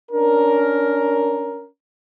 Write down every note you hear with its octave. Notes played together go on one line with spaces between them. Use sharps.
C#4 D4 A#4